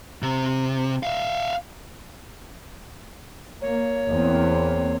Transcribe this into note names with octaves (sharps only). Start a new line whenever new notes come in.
C3
E5 F5
A#3 C#5
E2 A#3 C4